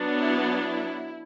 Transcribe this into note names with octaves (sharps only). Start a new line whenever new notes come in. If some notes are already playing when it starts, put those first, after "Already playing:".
Already playing: F#3 B3 D4
E4
E4